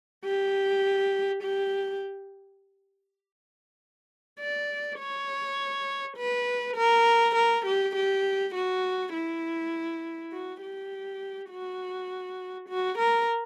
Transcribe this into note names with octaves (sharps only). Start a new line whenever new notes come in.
G4
G4
D5
C#5
B4
A#4
A#4
G4
G4
F#4
E4
F#4
G4
F#4
F#4
A#4